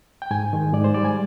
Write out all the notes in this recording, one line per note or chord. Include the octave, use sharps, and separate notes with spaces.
G5
G#2 G#5
D#3 G#3
G#2 D5
C5
G3 D5
G#5